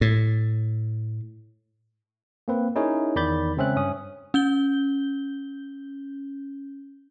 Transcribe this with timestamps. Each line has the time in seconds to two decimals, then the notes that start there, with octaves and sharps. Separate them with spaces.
0.01 A2
2.48 A#3 C4 B4
2.76 C#4 D#4 E4 G#4 A#4 C#5
3.16 E2 D#3 D5 B5 G6 A6
3.57 C#3 G#3 C4 C#4 E5 F#6
3.76 G2 C#4 D#6
4.34 C#4 G6 G7